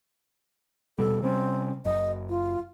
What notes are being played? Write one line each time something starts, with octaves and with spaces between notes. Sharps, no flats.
D#1 B2 G3 A4
C3 G3 C4 C#4
F#1 F#2 D#5
F4